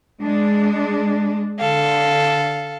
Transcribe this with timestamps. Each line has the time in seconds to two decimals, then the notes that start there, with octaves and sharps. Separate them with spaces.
0.21 G#3 D4
1.60 D3 A4 F5